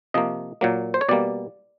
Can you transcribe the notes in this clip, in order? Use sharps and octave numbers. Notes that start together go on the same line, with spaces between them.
C3 F3 A#3 D#5
A#2 F#3 A#3
C5
C#5
B2 G3 A#3 D5